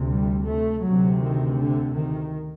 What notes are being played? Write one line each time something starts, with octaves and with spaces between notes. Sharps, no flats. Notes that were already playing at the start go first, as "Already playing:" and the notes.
Already playing: D2 C3
G3
A3
D2 C3 F#3
D#3
D3
D#3